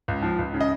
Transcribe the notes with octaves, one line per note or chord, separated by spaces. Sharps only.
C#2
F3
C#2
C#3
D#5